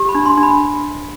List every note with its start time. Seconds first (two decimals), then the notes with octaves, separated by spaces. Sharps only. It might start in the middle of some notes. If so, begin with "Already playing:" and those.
Already playing: G4
0.09 B5
0.15 D4
0.26 C6
0.37 D4
0.43 B5